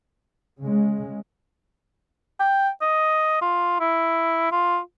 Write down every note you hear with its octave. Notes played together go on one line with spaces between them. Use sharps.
C#3 G#3
G5
D#5
F4
E4
F4